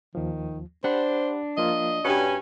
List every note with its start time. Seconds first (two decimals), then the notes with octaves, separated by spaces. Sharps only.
0.15 D#2 D#3 F3
0.84 D4 G4 C5 F#5 B5
1.57 F3 A#3 F4 D#5
2.05 G2 C#4 F#4 B4 G#5